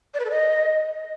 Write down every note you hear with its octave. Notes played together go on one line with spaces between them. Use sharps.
D5
B4
A4
D#5